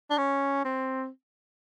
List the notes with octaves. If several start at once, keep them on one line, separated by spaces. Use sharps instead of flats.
D4
C#4
C4